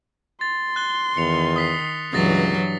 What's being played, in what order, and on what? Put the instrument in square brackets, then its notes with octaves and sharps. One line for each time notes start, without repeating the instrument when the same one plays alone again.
[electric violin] C6 [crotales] A6
[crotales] F#6 G7
[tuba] E2 [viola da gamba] D#3 [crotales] C#7 F7
[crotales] D#6 B6 C7
[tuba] C#2 [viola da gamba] G2 E3 F#3 [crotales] D#6 A6 A#6